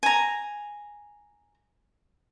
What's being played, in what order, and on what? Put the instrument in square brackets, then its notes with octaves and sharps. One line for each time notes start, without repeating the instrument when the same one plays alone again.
[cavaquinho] G#5 A#5